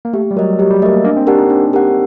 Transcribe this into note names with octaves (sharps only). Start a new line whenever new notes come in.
A#3
A3 G4
G3
F#3 A#4 D#5
F#3 G4
G3
A3 A#4 D#5
A#3
A#3 D4
C4
D4 G4 A#4 F#5
D#4
C4 D4
G4 A#4 F#5